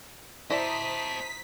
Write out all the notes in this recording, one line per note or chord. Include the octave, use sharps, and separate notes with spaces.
E4 C5 D5 D#5 A5 A#5 D#6 B6